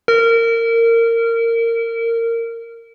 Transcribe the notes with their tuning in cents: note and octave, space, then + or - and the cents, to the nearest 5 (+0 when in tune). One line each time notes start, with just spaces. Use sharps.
A#4 -20